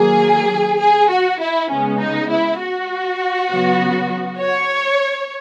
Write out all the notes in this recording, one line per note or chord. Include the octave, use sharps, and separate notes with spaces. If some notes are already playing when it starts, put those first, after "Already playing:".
Already playing: D#3 F#3 A#3 G#4
G#4
F#4
E4
C#3 G#3 B3 C#4
D#4
E4
F#4
C#3 F#3 B3
C#5